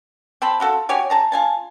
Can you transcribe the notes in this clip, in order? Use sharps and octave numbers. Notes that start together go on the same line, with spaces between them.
C4 C5 A5 B5
F4 F#4 A4
F#4 G4 C#5 G#5
G#4 A5 A#5
F4 G#5 A5